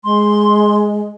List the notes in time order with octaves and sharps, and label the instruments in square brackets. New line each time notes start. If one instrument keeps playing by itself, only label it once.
[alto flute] G#3 [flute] C6